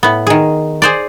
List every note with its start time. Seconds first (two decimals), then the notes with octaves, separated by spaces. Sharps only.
0.03 A2 B3
0.27 D#3 G#4
0.82 G#4 C5 D5